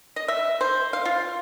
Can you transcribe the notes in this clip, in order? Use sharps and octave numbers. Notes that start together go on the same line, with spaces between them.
D#5
E5
C5
F5
F4